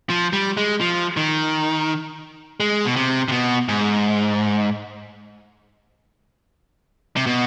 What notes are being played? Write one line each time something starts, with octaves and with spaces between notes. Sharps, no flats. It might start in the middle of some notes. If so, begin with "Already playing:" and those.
F3
G3
G#3
F3
D#3
G#3
B2
C3
C3
B2
G#2
C3
B2